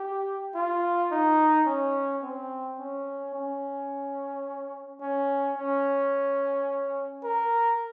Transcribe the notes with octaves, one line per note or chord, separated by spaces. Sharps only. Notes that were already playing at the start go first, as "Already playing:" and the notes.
Already playing: G4
F4
D#4
C#4
C4
C#4
C#4
C#4
C#4
A#4